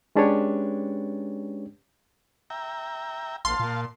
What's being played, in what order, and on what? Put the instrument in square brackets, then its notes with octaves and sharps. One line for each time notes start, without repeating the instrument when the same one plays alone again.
[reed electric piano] G#3 C#4 D4 G4 B4 C#5
[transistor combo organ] E5 G5 A#5
[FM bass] A#1 [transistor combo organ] F5 A5 [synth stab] C6
[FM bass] A#2